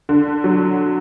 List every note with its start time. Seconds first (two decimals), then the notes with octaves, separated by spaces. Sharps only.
0.09 D3
0.44 F#3